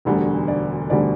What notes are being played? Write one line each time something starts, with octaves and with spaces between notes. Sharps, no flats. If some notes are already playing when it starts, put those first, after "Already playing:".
E1 D2 D3 G3
D5
E1 D2 D3 G3 D5